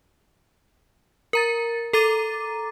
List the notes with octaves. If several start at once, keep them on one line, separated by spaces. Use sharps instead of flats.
A#4 A#5 A6
A4 A#5 D6 A6 D#7